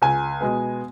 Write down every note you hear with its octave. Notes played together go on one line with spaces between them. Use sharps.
C#2 G#5
B2 G#3 B3